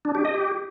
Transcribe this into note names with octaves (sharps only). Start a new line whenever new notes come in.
D4
G4
D#5
G4